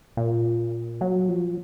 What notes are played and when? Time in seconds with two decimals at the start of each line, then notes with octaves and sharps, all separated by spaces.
0.17 A#2
1.01 F#3
1.29 F3